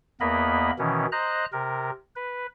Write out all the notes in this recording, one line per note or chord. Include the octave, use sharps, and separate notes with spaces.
E2 A#3 B3 A#4 D#5 B5
B2 D#3 E3 C#4
C5 D#5 A#5 F#6
C3 A#4
B4